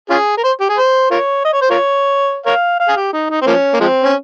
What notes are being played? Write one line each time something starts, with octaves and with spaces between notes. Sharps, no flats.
C#4 F4 G#4
A#4
C5
G4
G#4
C5
F4 A#4 C#5
D#5
C#5
C5
F4 A#4 C#5
A#4 C#5 F5
F5
G#4
G4
D#4
D#4
C4
F3 A#3 C#4
A#3
F3 G#3 C4
C#4